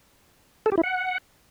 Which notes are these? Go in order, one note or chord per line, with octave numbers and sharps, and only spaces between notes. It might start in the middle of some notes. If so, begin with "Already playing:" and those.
A4
G4
E4
F#5